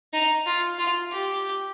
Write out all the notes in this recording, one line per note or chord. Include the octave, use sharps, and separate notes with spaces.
D#4
F4
F4
G4